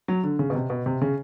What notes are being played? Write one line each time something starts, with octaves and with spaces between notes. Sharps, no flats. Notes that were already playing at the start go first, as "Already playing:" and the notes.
F#3
D3
C#3
B2
C3
B2
C3
C#3